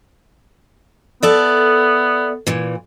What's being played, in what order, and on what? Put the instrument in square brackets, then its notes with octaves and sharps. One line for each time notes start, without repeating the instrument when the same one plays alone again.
[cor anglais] B3 [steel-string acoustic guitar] A4 D5 E5
[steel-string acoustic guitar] A#2 E3